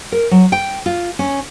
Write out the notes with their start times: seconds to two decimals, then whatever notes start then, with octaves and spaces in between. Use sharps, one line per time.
0.12 A#4
0.31 F#3
0.52 G5
0.86 F4
1.19 C#4